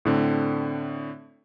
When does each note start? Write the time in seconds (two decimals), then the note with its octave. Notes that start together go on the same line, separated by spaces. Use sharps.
0.05 A2 D3 C4